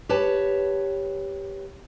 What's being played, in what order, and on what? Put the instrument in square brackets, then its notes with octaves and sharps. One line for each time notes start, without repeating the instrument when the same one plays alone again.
[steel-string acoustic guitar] G4 B4 C#5 A5